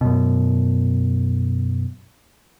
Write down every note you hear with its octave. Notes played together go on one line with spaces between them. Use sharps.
F#2 B2